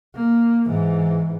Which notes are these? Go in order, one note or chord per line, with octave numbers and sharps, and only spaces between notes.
A#3
G#2 E3